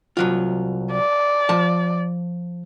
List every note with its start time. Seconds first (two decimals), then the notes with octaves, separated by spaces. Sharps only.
0.17 C2 F#3 F4
0.92 D5
1.49 F3 A5